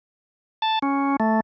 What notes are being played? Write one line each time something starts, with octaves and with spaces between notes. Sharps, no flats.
A5
C#4
A3